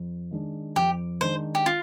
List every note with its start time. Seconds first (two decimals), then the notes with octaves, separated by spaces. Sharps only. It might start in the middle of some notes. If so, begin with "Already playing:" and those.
Already playing: F2
0.31 D#3 G#3 D4
0.76 F2 G4
1.21 D#3 G#3 D4 C5
1.55 G4
1.66 F4